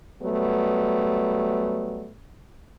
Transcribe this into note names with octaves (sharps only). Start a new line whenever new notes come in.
F#3 G3 A3 B3